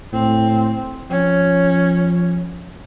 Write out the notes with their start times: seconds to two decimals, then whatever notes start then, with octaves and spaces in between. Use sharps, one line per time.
0.13 A2 C4
1.10 F3 C#4